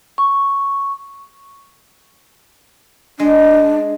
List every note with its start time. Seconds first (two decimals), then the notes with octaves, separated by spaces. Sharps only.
0.18 C#6
3.20 G#3 D4